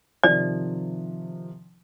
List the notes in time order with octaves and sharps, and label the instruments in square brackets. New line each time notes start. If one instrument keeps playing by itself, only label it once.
[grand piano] C3 D#3 F3 [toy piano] D5